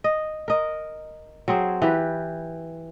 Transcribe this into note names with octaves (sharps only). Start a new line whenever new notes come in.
D#5
A#4 D#5
F#3 C4 G#4 C5
E3 G4 B4